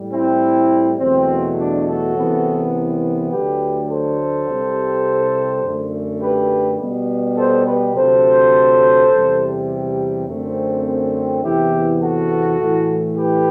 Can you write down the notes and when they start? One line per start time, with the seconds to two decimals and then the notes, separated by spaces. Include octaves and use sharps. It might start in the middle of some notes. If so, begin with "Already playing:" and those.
Already playing: A2 G3
0.12 C4 E4
0.99 E2 B2 F#3 A3 C4
1.57 D4
1.85 F#4 A4
2.15 C2 C3 E3 B3
3.31 D2 D3 F#3 A3 G4 B4
3.89 A4 C5
4.47 C2 C3 G3
5.63 F#2 D3 A3
6.20 G4 B4
6.79 B2 G3 B3
7.36 A4 C5
7.66 G4 B4
7.94 D2 C3 F#3 A4 C5
9.11 E2 C3 G3
10.27 F#2 D3 A3 C4
11.43 E2 C3 E3 B3 E4 G4
12.00 F#4 A4
12.59 A2 E3 A3
13.16 G4 B4